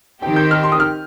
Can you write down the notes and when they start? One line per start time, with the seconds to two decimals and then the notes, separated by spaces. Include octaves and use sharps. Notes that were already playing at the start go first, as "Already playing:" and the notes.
0.22 D#3 C4 G4 G5
0.36 G6
0.51 F6
0.63 C6
0.72 D#6
0.80 F6